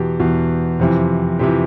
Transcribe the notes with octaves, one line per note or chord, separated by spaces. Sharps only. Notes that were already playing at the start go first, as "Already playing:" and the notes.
Already playing: E2 B2 G4
E2 B2
F2 C3 E3
F2 C3 E3 G4